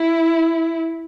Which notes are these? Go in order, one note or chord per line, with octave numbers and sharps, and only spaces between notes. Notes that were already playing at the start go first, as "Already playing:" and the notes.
Already playing: E4